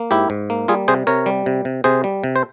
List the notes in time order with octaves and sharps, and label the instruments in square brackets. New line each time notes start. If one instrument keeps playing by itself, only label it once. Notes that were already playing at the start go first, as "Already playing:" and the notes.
Already playing: [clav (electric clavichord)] A#3
G#2 E4 G4
G#2
A#3
G3 F4 G#4
C3 G#4 C5
C3 A#4 C#5
G3
C3
C3
C3 G#4 C5
G3
C3
C5